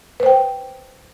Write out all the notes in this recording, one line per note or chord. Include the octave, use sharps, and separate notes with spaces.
B4 C5 G5